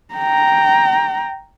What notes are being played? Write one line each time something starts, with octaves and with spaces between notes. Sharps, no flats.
G5 A#5